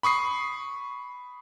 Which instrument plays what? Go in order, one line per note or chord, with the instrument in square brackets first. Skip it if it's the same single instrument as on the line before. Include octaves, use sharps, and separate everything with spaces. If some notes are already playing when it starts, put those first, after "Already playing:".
[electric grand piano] B5 C#6 D#6 C7